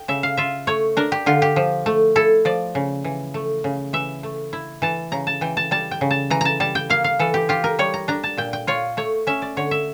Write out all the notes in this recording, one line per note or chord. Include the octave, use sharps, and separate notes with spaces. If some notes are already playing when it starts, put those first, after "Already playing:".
Already playing: G5
C#3 E5
F5
F4 E5
A3 C#5
D4 A#4
G4
D3 F4
G4
F3
A3
E4 A4
F3 D5
C#3
E3
A3
C#3
E3 E5
A3
E4
E3 A5
C#3 A#5
A5
E3 G5
A5
G3 A5
G5
C#3
A5
E3 A#5
A5 A#5
G3 A5
G5
A#3 F5
F5
E3 A4
G4
F4 G4
A#4
G3 C#5
A#5
D4 A#5
A5
A#2 G5
G5
F4 C#5
A3 C#5
C#4 E5
D5
D3 C#5
E5